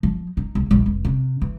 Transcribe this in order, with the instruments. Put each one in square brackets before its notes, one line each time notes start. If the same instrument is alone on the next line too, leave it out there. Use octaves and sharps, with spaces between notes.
[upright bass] F3
D#4
C2
A#1
F1
C3
E3